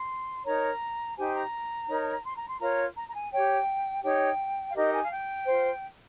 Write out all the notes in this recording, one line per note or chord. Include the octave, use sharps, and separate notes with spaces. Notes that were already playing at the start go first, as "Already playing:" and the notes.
Already playing: C6
D#4 A#4 C#5 A#5
D#4 G4 C5 G#5
A#5
D#4 A#4 C#5
C6
A#5
C6
F4 A#4 C#5 A#5
A#5
A#5
G#5
G4 C#5 G5
D#4 G4 C#5 G5
F5
D#4 G4 A#4 D#5
G#5
F5
G5
F4 C5